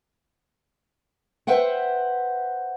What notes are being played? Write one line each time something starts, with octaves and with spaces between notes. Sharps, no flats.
B4 C5 E5 F#5 G5